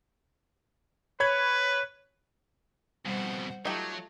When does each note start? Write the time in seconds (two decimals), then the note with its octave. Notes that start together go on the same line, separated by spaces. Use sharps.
1.20 B4 C#5 B5 G#6
3.06 F2 B2 G3 C5 F#5
3.65 F#3 A3 D#4 F4 G4